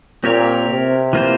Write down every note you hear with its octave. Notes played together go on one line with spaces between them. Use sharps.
A#2 C4 G4 A#4 C#5
C3
E3 A#3 F4 C5